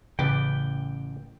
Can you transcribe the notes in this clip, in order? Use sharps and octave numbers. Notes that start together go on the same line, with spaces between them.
A1 C#3 B4 D5 G5